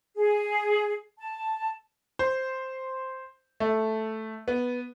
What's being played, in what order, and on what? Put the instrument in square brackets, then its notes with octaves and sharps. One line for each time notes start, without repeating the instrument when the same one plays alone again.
[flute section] G#4
A5
[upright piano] C5
A3
B3